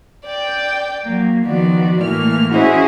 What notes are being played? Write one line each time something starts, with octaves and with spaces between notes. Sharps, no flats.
D5 G5
F#3 A#3
D#3 F3 B3 F#4 D5
A2 E3 A3 A#3 F6
C#4 E4 F#4 G#4 C5 D#5